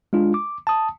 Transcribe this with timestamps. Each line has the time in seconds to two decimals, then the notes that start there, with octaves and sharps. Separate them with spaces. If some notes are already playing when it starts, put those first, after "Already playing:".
0.13 G#3 D4 F4
0.34 D6
0.67 A5 D#6